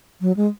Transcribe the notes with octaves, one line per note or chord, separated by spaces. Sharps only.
F#3
G#3